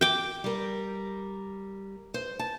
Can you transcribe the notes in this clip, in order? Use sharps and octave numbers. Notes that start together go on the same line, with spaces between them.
G5 D6
G3 A#4
C5
A5